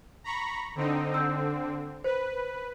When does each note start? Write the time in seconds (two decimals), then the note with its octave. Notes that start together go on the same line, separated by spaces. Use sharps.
0.24 A#5 B5 C#6
0.75 D3 C4 D#4
1.14 D3 C4 E6 G6
2.04 B4 C5